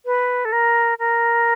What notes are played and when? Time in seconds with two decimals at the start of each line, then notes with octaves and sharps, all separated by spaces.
0.06 B4
0.45 A4
0.52 A#4
0.99 A#4